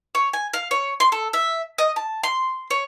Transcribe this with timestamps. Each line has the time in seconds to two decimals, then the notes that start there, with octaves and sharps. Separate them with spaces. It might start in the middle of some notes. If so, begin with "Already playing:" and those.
0.15 C#5
0.33 G#5
0.53 F5
0.71 C#5
1.00 C6
1.12 A4
1.33 E5
1.78 D#5
1.96 A5
2.23 C6
2.71 C#5